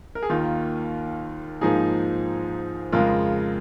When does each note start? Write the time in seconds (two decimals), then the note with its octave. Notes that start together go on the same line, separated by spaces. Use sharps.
0.15 A#4
0.23 G#4
0.29 D#2 D#3 A#3 F4
1.61 G#2 F3 A#3 D#4 G#4
2.92 F2 C#3 G#3 F4 A#4